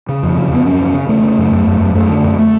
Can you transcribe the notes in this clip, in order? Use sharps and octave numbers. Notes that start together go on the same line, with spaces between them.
C#3
F2
C#3
F2 B3
F#2 C#4
C#3
C#3
C#3 A3
C#3
F#2
F#2
F#2
F#2
F#2 A3
D3
F#2
A3